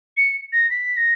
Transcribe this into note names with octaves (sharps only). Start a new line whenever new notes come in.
C#7
A#6
B6
A#6